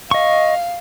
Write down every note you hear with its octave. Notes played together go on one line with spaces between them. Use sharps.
D#5 F5 C#6